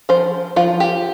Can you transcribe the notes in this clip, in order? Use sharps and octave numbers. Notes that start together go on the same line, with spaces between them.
F3 C5
F3 F4
G4